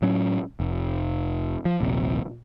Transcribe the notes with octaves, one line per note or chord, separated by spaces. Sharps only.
A2 F#3 C#4
F1
F3
D#1 A#1 C3